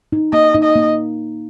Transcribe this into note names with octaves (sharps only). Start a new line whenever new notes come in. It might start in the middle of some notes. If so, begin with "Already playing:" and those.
D#4
A#3 D#5
D#4
D#5
A#3